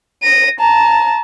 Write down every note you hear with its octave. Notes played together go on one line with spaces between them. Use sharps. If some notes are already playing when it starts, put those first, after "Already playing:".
A#6 D#7
A5 A#5